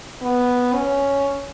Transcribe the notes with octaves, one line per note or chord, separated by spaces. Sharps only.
B3
C#4